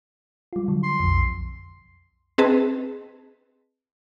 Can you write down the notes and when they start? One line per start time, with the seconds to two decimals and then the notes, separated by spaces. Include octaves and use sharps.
0.53 G3 F4
0.68 D3 F#3
0.83 C6
1.00 B1 F2
2.38 C4 G#4 B4 D#5 A5